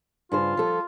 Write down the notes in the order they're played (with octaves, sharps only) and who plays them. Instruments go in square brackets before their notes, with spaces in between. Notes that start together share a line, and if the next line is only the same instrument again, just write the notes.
[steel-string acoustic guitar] G2 C#3 C5 [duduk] F4
[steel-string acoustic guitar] F3 A4